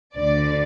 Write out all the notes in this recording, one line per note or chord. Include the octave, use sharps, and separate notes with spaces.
D2 D3 D5